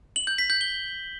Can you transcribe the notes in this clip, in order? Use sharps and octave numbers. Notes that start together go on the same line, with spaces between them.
F#7
G6
B6
G6
G7